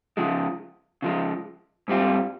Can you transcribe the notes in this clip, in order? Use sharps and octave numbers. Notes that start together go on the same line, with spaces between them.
C#3 F3 G#3
C#3 F3 G#3
G#2 G3 C4 F4